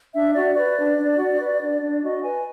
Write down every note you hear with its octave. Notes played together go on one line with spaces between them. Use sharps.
D4 E5
F#4 D5
B4 D5
D4
D4
F#4
B4
D4
D4
F#4 D#5
B4 G#5